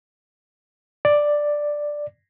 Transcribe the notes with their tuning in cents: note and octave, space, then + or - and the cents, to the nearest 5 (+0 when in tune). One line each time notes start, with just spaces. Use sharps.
D5 +5